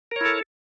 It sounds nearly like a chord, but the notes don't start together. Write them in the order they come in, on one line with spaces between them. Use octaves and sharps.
A#4 C#5 E4 A4